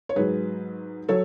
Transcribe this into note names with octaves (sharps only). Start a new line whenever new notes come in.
C#5
G#2 F#3 G#4 B4
F#3 A4 C#5